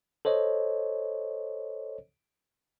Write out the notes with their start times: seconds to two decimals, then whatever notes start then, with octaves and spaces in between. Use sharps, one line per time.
0.25 A4 C5 C#5 D#5